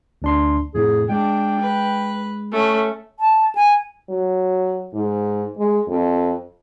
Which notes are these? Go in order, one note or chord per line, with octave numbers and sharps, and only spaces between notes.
D2 D4 C6
F2 A2 C3 G#4
G#3 D4 G5
B4
A3 C#4
A5
G#5
F#3
G#2
G#3
F2